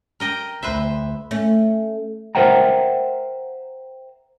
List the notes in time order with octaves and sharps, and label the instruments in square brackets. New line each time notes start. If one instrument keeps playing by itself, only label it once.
[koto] A#4 D#5 G5
[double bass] D2 [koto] B4 C5 E5
[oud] A3 C#4
[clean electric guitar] A#4 C5 E5 F#5 G5 A#5